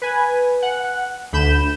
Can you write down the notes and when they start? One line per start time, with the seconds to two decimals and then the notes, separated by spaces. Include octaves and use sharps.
0.02 B4 G#5
0.62 F#5
1.33 D2 B5 G6 E7